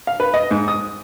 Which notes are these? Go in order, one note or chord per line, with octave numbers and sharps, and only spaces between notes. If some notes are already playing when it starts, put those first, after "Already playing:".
F5
B4
D#5
G#2
D#6